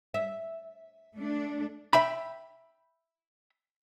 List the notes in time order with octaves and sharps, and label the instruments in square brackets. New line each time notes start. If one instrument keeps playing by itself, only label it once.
[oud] E5
[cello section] A3 D4
[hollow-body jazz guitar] E5 G5 B5